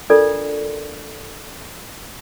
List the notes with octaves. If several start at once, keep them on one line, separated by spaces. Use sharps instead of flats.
D4 F4 A4 A#4 D5